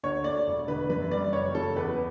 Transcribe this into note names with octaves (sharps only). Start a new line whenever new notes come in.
D2 C#5
A3 D5
E1
D3 B4
F#2 B4
G3 D5
F#1 C#5
C#3 A4
E2 B4